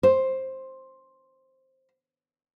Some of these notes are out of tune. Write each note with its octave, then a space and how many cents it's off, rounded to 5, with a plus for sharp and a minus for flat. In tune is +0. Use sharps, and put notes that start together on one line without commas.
C5 +10